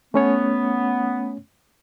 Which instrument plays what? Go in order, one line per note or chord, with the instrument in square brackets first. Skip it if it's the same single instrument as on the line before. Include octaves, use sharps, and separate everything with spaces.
[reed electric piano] A3 C#4 C#5 [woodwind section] B3